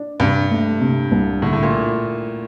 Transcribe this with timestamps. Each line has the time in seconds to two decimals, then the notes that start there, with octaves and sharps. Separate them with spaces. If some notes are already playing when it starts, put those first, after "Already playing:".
Already playing: D4
0.20 G2 C3
0.51 A3
0.81 C3
1.12 C2
1.42 A2 D3
1.53 A2
1.62 A#2